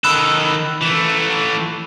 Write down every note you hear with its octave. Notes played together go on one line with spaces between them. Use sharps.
D#3 A4 B5 E6 F#6
E3 A3